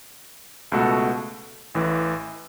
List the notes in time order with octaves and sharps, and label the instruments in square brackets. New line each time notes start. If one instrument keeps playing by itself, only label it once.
[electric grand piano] C#2 B2 A3 F#4 A4
A1 A2 E3